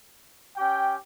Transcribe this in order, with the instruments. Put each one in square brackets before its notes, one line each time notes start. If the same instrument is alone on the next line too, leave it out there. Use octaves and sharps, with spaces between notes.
[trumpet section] C#4 G4 G5